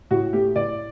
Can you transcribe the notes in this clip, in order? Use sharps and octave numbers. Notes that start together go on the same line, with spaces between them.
A2 F#4
A3 G4
A2 D5